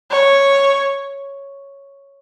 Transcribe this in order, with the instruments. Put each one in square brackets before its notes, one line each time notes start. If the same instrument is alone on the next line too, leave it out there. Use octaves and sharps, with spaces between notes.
[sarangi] C#5